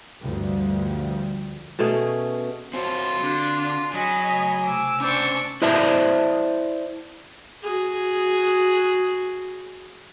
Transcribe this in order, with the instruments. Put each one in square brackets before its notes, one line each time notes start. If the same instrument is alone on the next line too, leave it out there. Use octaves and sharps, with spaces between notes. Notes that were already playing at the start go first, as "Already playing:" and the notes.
[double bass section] D2 G2 F3 G3
[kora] B2 A3 C#4 G#4
[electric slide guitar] C4 F#4 C#5 [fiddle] F4 [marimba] C5 A5
[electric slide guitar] D3 [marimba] C4 F#4 [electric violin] D4
[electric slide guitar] F#3 [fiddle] G#4 [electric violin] D#5 B5
[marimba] C#3 A3
[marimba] C3 A3 [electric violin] D6 E6
[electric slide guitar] C#4 C5 [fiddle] D4 C#6 [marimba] B5 G6
[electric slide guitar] E4 C5 D5 E5 A5
[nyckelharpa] F#4 G#4